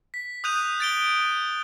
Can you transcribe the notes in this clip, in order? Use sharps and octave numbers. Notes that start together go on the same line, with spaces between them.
B6
D#6 F#6 G6 D#7 F7
A6 D7 G7